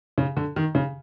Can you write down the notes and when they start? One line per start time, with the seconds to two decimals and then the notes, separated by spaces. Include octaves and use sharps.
0.18 C#3
0.37 D3
0.56 D#3
0.75 C#3